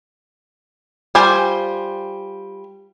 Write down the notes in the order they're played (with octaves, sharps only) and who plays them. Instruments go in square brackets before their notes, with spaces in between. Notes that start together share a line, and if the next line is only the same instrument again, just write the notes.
[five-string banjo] G3 F4 C5 G#5